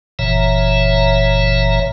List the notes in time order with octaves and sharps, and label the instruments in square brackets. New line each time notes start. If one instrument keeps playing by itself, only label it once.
[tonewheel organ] F#1 A#2 E3 C#5 E5 A#5